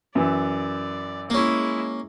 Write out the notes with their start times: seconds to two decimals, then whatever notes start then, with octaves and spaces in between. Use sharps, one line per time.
0.15 F#2 E3 D5
1.30 G#3 A#3 C#4 E4